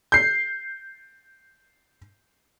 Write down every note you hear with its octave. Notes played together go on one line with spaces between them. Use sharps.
G6 C7